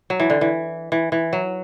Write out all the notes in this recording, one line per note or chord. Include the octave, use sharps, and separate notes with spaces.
F#3
E3
D3
E3
E3
E3
F#3